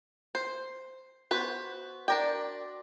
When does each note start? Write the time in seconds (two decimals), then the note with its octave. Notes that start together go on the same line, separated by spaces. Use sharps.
0.35 C5
1.31 B3 F#4 B4 C5
2.08 D4 A#4 D5 G5